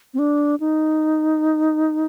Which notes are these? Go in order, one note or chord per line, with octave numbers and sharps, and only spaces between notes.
C4
D4
D#4